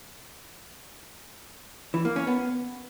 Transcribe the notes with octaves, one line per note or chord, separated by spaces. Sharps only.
E3
A#3
C#4
B3